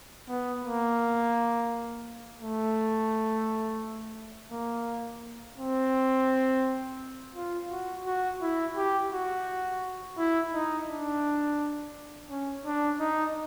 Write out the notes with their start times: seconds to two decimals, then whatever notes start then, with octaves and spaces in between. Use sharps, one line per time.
0.29 B3
0.64 A#3
2.40 A3
4.52 A#3
5.58 C4
7.34 F4
7.71 F#4
8.06 F#4
8.41 E4
8.76 G4
9.12 F#4
10.18 E4
10.53 D#4
10.88 D4
12.30 C#4
12.65 D4
13.00 D#4